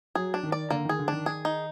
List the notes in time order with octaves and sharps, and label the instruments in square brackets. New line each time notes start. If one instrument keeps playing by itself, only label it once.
[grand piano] F#3 [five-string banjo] G#4
[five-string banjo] D4
[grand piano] D#3
[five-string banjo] D5
[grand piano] D3 [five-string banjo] A#3
[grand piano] D#3 [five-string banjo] G#4
[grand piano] D3
[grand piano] D#3 [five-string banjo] D4
[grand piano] D#3 [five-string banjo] G#4
[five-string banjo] D#4